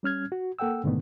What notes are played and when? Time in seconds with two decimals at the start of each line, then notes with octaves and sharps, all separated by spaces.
0.03 G3 C#4 F6 G#6
0.32 F#4
0.59 A#3 A4 F#5 G5 E6
0.84 G#2 B2 D3 D#3 A3 B3